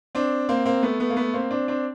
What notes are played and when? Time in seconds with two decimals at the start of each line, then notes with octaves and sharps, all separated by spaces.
0.15 C4 D4
0.49 A#3 C4
0.65 A#3 C4
0.83 A3 B3
1.00 A3 B3
1.10 A#3
1.17 A3 B3
1.34 A#3 C4
1.51 C4 D4
1.68 C4 D4